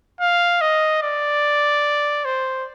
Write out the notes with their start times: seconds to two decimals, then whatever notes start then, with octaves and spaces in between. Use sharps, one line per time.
0.21 F5
0.61 D#5
1.03 D5
2.25 C5